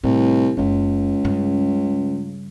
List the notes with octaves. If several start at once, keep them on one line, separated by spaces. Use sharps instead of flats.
C2 A2
F#1 C#2 A#3
G2 C#3